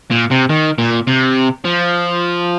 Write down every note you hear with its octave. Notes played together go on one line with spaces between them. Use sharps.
A#2
C3
D#3
A#2
C3
F3